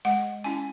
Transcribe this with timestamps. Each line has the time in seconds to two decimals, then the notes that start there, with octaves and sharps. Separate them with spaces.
0.05 G#3 F#5
0.44 C#4 E4 G#5